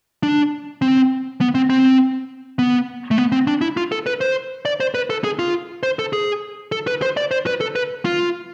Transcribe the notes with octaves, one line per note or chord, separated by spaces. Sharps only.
D4
C4
B3
C4
C4
B3
A3
B3
C4
D4
E4
F4
A4
B4
C5
D5
C5
B4
A4
G#4
F4
C5
A4
G#4
A4
B4
C5
D5
C5
B4
A4
B4
F4